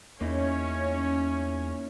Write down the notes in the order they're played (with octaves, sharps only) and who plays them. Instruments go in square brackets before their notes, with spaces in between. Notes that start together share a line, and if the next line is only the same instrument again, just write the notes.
[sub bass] E2 [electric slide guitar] A#3 D#4 E4 [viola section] C#4 C#5